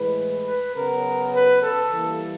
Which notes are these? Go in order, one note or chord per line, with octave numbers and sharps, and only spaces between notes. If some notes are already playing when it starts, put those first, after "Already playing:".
Already playing: A2 E3 G#3 B4
B4
C#3 F#3 B3 A#4
B4
A4
E3 G3 A#3